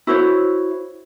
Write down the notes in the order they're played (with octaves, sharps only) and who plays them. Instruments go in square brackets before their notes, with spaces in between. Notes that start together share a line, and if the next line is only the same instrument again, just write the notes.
[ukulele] E4 F#4 C5 C#5